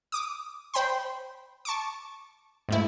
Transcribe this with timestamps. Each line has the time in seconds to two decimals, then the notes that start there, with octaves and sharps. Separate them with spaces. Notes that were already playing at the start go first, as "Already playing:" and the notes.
0.12 D6 D#6
0.74 C5 G5 B5 C6
1.65 A5 C#6 D6
2.69 G#2 A3 E4